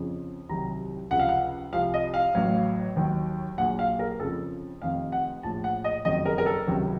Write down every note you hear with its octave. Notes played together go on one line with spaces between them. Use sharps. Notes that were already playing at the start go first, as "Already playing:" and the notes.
Already playing: F2 C#3 F3
C2 C3 D#3 F#3 A#5
C#2 C3 F3 F#5
F5
F#5
C2 C3 F3 F5
D#5
F5
A1 A2 F#3
D#2 D#3 F#3
A#1 A#2 F#3 F#5
F5
A#4
F2 C#3 F3 A4
F1 F2 D#3 F5
F#5
A#1 A2 F3 A5
F#5
D#5
F#1 F2 D#3 F#3 D#5
A#4
A#4
A4
C#2 C3 D#3 F#3